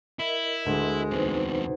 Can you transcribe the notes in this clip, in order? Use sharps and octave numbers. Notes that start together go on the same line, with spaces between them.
E4 A#4 D#5
D2 G#3
E2 C3 D#4 B4 C5